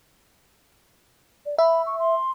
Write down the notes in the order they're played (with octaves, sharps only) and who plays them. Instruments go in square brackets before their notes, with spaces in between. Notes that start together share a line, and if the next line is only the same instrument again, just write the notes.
[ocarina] D5
[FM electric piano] E5 [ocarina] B5
[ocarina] C#6
C6